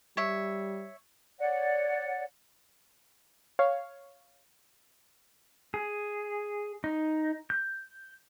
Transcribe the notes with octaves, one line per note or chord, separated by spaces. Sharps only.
G3 C#5 E5
C#5 D5 F#5
C#5 F5
G#4
D#4
G6